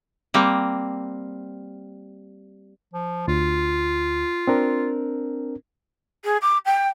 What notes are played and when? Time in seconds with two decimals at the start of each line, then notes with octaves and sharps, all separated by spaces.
0.34 G3 A#3 C4
2.94 F3
3.28 D2 F4
4.48 C4 D4 A#4
6.24 G#4
6.41 D6
6.65 G5